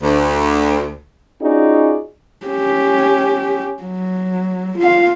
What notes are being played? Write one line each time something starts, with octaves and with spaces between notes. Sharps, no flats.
D2
C#4 D#4 F4 F#4 G#4 D5
C#4 G4
F#3
F4 F5